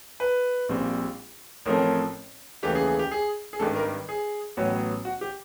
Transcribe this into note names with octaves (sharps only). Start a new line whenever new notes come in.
B4
A#1 A#2 G3 C4
A1 A2 F3 A3 C4 A#4
D#2 C#3 E3 A3 G4
G#4
G#4
G4
G#4
G#4
G#1 G2 D#3 G3 A4
A#4
G#4
A1 A2 F#3 B3
F#4
G4